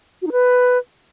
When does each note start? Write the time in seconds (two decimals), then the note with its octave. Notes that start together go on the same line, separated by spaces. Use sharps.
0.22 F#4
0.27 D#4
0.32 B4